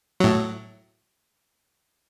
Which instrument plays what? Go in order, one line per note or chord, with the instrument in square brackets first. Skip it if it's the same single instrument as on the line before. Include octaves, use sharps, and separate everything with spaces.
[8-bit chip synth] A2 F#3